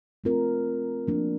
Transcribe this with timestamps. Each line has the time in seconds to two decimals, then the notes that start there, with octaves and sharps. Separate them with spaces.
0.24 A3 C4 F4 A#4
1.08 F3 A#3 D4